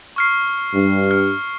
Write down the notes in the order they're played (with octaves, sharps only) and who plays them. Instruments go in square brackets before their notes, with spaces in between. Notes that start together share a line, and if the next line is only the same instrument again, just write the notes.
[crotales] C#6 F6 C7
[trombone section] G2
[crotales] F6